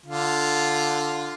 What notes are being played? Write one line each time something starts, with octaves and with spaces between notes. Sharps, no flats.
D3 F4